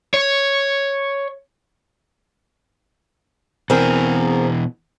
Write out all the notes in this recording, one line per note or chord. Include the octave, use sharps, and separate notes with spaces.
C#5
B2 E3 C4 G#4 A#4